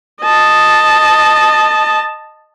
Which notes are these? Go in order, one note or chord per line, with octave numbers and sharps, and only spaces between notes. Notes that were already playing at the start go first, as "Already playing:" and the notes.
D#5 A5